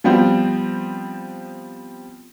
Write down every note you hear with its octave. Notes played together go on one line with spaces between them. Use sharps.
F3 G3 B3 C4